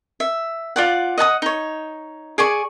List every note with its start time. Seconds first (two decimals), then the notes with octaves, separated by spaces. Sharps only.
0.20 E5
0.76 F4 D5 F#5
1.18 D#5 F#5 A5 D#6
1.42 D#4 C#5
2.38 G#4 D5 G#5 C#6